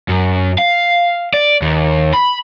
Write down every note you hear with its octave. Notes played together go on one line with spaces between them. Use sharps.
F#2
F5
D5
D#2
B5